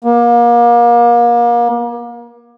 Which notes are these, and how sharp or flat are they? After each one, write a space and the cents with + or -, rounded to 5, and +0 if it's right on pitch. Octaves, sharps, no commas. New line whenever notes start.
A#3 +30